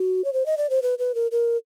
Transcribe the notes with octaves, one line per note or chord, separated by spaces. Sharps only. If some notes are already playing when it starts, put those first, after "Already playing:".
Already playing: F#4
C#5
C5
D#5
D5
C5
B4
B4
A#4
A#4